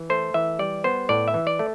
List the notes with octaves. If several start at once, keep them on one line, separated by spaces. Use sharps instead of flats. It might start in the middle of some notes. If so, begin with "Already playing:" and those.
Already playing: E3
A3 C5
E3 E5
G3 D5
B3 C5
A2 D5
E5
E3
D5
A3